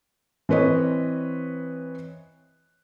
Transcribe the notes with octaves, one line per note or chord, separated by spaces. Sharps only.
E3 C4 B4 C#5 D#5